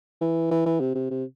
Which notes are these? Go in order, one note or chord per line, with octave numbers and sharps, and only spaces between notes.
E3
E3
E3
C3
C3
C3